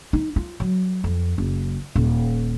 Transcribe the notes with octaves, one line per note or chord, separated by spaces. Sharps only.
D#4
F4
F#3
F2
F#1
D#1